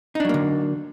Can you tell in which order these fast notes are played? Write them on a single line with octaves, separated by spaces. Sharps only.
D#4 D4 F#3 A#3 D3